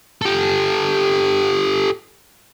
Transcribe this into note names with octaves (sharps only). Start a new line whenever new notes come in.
G4 A4